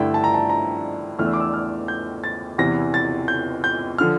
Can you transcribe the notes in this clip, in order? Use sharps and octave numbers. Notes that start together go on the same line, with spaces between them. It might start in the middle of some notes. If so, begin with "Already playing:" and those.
Already playing: G2 D3 A3 E4 G5
A5
A#5
A5
A#5
E2 E3 A3 D4 F6
E6
D6
E6
F6
G6
A6
E2 C3 E3 A#6
A6
G6
G6
D3 F3 F6